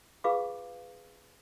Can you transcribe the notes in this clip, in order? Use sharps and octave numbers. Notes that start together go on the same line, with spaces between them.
F4 G#4 B4 F5 C#6 D6